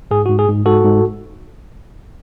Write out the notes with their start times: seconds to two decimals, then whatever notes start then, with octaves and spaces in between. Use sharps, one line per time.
0.11 G#2 G#4
0.26 G#2 F#4
0.39 G#4
0.48 G#2
0.66 G#2 F#4 A4
0.84 G#2